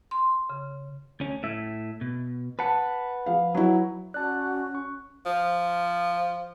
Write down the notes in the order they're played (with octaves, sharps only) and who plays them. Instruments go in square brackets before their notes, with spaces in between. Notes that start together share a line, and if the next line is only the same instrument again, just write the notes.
[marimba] C6
C#3
[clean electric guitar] D2 C#4
A2 E5
B2
[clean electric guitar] B4 F#5 [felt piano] A5
[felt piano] F3 F5
F#3 E4
[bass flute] C#4 [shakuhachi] F#4 [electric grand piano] D5 A5 [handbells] F#6
[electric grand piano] C#6
[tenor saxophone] F3